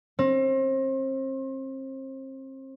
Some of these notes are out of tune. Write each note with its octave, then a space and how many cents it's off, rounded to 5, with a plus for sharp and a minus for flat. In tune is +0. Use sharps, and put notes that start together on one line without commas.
C4 +35